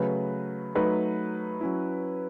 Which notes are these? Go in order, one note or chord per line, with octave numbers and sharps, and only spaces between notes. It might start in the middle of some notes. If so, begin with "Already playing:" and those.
Already playing: C#3 F#3 A3 B4
F#3 A3 D#4 B4
F#3 C#4 E4